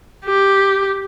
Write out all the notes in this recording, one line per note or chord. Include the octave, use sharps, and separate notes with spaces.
G4